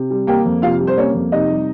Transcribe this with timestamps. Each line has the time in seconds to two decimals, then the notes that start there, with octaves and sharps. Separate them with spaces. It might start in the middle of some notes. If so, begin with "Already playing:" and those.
Already playing: C3
0.10 G3
0.27 A#3 G4 G5
0.45 F2
0.62 C3 F4 F5
0.80 G3
0.87 C5
0.97 A#3 C#4 C#5
1.14 F2
1.32 C3 D#4 D#5
1.50 G3